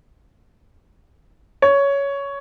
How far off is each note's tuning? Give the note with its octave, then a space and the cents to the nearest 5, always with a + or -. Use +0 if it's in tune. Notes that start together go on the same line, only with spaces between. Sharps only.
C#5 +10